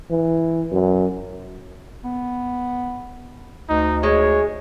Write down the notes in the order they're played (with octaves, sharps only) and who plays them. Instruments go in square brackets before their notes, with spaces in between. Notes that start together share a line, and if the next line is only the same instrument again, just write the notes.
[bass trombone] E3
F#2
[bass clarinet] B3
[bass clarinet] D2 [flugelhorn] D#4
[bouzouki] G#3 [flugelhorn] C#5